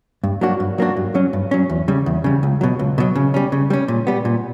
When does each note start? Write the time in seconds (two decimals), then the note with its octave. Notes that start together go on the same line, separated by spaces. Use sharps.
0.23 G2
0.41 F#3 A#3 D4 F#4
0.60 G2
0.78 F#3 A#3 D4 F#4
0.97 G2
1.15 F#3 C#4
1.33 G2
1.51 F#3 C#4
1.69 E2
1.88 C#3 G3
2.06 E2
2.24 C#3 G3
2.43 C#2
2.61 B2 F#3
2.79 C#2
2.98 B2 F#3
3.15 C#3
3.34 G3 C#4
3.52 C#3
3.70 G3 C#4
3.88 A#2
4.07 G3 B3
4.25 A#2